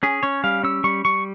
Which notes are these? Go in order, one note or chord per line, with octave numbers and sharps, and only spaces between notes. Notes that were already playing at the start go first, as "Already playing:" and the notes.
C#4 G#4
C#4 C#5
G3 F5
C#4 E6
G3 C#6
G3 C#6